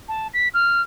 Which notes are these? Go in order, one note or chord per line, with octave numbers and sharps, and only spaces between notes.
A5
B6
F6